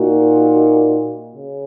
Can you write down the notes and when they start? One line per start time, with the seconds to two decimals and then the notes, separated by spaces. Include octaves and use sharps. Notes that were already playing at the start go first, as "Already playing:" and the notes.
Already playing: A#2 A#3 D#4 F#4
1.36 C#3